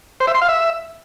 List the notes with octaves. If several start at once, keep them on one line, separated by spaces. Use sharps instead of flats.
C5
E5
C6
F5
E5